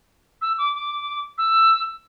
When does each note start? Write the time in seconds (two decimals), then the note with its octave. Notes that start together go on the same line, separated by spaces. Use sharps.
0.42 E6
0.58 D6
0.74 D6
1.38 E6